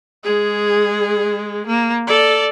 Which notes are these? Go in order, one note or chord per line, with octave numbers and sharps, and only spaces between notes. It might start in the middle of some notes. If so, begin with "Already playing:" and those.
G#3 G#4
A#3
A4 D5